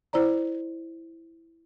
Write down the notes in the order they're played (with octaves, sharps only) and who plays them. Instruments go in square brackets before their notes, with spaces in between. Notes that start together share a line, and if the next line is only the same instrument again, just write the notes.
[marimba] E4 C5 D5 A#5